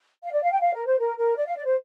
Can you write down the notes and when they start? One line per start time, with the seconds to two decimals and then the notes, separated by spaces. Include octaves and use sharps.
0.23 F5
0.32 D5
0.42 F5
0.52 G5
0.61 F5
0.74 A#4
0.86 C5
0.99 A#4
1.17 A#4
1.36 D5
1.46 F5
1.57 D5
1.65 C5